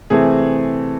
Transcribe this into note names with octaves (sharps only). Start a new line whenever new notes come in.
C3 E3 A3 C4 G#4